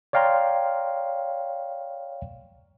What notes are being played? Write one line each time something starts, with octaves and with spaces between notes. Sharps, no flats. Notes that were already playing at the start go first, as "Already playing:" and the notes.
C#5 D5 F5 G5 A#5 C6